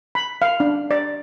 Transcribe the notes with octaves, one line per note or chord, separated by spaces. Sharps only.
B5
F5
D4
D5